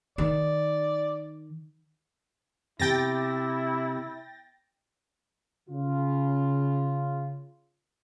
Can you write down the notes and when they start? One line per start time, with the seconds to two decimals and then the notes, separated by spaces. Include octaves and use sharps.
0.18 D#3 D5
2.79 C3 E4 G4 G5 A6 A#6
5.69 C#3 F4